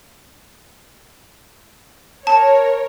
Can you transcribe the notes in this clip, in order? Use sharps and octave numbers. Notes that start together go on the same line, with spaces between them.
A#4 C#5 A5